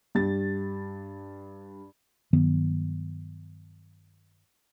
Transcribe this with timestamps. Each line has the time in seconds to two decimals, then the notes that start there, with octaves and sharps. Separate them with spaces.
0.15 G2 G4 A6
2.33 G2 D#3 F#3 B3